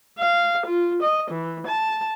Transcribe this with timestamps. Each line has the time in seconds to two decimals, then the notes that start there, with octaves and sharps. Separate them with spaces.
0.20 F5
0.66 F4
1.02 D#5
1.31 E3
1.68 A5